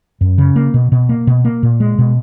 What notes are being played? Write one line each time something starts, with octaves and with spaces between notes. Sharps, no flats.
F#2
C#3
A#3
B2
B2
A#3
B2
A#3
A#2
G#3
B2